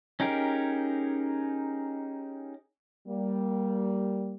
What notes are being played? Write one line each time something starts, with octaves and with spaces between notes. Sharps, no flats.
C#4 D#4 G4 G#4 A#4
G3 A#3